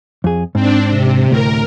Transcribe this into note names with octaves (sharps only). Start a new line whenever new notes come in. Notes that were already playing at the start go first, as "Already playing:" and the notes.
F2 G#4
G#2 C4 D4
C3
D2 A2 A#4